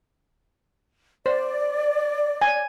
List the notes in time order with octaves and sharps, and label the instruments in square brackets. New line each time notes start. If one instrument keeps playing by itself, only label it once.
[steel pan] C5 [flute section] D5
[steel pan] G#5